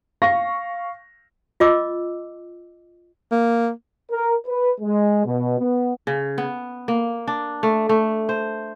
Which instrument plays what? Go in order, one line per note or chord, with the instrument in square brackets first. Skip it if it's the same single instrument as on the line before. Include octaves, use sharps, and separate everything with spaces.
[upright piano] F5 C#6 A#6
[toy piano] F4 D#5 D6 E6
[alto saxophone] A#3
[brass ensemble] A#4
B4
G#3
B2
B3
[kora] C#3
B3
A#3
D4
A3
A3
C5